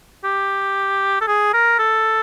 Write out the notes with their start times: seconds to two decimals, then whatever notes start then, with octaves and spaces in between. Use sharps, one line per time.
0.24 G4
1.21 A4
1.28 G#4
1.53 A#4
1.79 A4